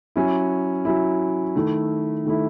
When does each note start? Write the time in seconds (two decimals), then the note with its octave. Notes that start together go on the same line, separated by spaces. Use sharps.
0.16 F#3 C#4 E4
0.85 F#3 C#4 E4
1.56 D#3 A3 E4
2.25 D#3 A3 E4